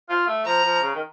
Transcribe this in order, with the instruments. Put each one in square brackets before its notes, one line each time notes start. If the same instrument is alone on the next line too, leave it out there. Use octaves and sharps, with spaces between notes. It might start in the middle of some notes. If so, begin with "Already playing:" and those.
[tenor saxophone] F4
A3
[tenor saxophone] F3 [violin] A#5
[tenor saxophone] F3
C#3
D#3